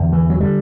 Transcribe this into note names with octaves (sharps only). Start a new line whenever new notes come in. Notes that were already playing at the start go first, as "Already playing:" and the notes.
Already playing: E2 D3
E3
F#3
D3 G3